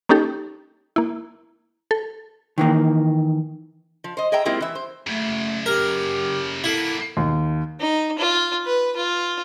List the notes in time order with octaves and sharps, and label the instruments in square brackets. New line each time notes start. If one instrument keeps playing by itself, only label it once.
[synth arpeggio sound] A#3 C#4 D#4 G4 A4
A#3 E4
A4
[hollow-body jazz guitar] D#3 E3 A#3
[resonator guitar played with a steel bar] F3
C5 D#5
G#4 D#5 E5 G5 A#5
G#3 A#3 C4 E4 F4 G4
E3 E5
C5
[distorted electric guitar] F#2 C#3 [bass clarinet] A3
[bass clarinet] G4 [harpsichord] A#4
[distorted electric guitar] A#3 B3 [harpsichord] E4 [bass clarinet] A4
[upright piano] D#2
[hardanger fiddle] D#4
F4
B4
F4